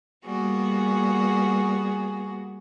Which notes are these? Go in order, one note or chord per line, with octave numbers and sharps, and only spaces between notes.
G3 A#3 B3 F#4 G#4